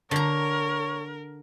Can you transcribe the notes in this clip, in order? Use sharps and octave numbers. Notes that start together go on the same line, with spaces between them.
D3 A#4 C#5 A#5